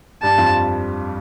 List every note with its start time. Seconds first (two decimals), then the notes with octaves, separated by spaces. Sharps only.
0.23 G2 G3 A5
0.38 F2 F3